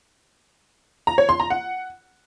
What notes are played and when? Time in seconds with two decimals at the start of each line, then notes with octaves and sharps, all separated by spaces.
1.07 A#5
1.18 C#5
1.29 C6
1.40 A#5
1.50 F#5